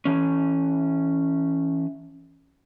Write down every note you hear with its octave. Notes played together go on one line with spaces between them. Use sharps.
E3 C#4